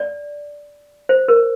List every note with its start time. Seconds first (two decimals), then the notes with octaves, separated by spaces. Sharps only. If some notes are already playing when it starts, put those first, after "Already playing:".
Already playing: D5
1.09 C5
1.28 A#4